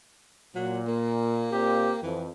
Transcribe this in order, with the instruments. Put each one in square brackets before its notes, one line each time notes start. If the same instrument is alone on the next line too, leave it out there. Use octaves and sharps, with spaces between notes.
[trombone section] A#2 [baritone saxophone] F#3
[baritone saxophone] A#3
[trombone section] A#2 C4 G4
[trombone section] F2 [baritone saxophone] E3